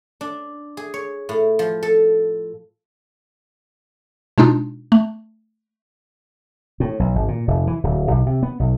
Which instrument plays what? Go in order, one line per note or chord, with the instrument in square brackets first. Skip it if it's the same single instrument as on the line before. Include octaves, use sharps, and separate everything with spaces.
[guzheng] D4
G#4
C#5
A2
F3
A4
[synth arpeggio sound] B2 G#3 D4 D#4 F4
A3
[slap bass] A2
B1
G#1
A#2
F1
E3
D1
B1
C3
B3
B1